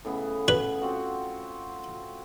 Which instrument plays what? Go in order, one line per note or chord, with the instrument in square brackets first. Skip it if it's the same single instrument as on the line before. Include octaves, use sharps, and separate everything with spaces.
[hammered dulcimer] A2 C#3 B3
[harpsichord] B4
[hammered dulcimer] C4 F4 F#4